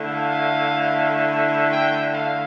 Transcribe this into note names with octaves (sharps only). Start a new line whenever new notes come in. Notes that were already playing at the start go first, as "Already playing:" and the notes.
Already playing: D3 A3 E4
F5
G5
F5